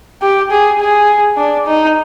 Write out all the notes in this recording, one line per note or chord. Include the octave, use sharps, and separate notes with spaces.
G4
G#4
G#4
D4
D#4